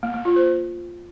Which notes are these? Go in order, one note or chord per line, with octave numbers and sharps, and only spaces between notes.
A#3
A#3
F4
C5